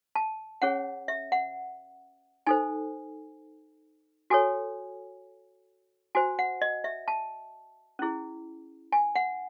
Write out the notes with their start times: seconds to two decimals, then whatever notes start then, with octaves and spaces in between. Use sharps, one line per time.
0.15 A5
0.62 C#4 G#4 C#5 F#5
1.08 E5
1.32 F#5
2.47 D#4 A4 C5 G#5
4.30 F#4 A4 C#5 G#5
6.15 F#4 C5 G#5
6.39 F#5
6.62 D#5
6.84 E5
7.08 A5
7.99 C#4 E4 G#4
8.92 G#5
9.16 F#5